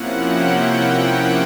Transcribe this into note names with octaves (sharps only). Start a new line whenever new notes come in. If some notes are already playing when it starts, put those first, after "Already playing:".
Already playing: C3 F3 A#3 C#4 E4 F#5
G5
G5